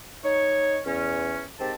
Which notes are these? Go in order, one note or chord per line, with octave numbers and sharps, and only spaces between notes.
D#4 C#5
E2 C#4
G#2 D#3 C4 G4 A5